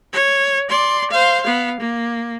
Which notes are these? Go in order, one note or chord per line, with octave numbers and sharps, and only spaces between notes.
C#5
D5 C6
C5 F5
B3 F5
A#3